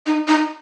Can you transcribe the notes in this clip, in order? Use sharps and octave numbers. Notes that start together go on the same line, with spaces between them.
D#4
D#4